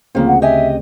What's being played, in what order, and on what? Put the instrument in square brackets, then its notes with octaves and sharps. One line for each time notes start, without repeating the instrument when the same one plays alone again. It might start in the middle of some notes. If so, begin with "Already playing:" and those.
[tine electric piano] D2 C#3 C4 [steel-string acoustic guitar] F3 A#3
[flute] F#5
[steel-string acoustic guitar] G4 D#5 G#5 [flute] E5